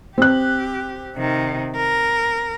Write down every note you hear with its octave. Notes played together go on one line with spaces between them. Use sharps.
C4 G4 F#6
C3 D#3
A#4